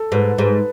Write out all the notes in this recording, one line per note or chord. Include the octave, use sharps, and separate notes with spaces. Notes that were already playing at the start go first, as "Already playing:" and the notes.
Already playing: A4
G#2 B4
G#2 B4